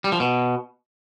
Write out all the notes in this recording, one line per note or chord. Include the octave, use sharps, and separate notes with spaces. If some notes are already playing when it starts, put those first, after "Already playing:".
G3
F3
B2